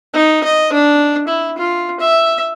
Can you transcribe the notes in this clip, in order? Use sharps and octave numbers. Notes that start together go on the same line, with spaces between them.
D#4
D#5
D4
E4
F4
E5